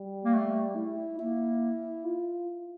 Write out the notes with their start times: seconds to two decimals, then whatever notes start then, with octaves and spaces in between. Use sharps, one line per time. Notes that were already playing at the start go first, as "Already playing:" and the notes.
Already playing: G3
0.25 A#3
0.34 A3
0.76 E4
1.19 A#3 E4
2.05 F4